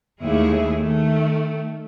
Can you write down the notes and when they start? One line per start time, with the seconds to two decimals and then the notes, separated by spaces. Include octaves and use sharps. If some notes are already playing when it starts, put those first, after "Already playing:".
0.21 D#2 G#3 A3 E4 G#4
0.78 D#3 A3